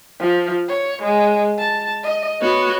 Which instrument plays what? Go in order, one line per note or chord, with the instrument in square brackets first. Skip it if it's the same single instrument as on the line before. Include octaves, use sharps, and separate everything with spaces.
[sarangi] F3
C#5
G#3
A5
D#5
[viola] B3 F#4 [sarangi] C#5